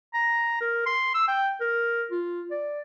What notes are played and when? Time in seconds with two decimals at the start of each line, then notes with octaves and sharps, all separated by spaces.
0.14 A#5
0.61 A#4
0.86 C6
1.14 E6
1.28 G5
1.61 A#4
2.11 F4
2.51 D5